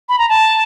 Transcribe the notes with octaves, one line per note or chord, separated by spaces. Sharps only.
B5
A#5
A5